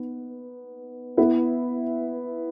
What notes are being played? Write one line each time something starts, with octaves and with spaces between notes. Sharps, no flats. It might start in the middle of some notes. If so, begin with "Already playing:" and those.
Already playing: B3 D#4
B3 E4 B4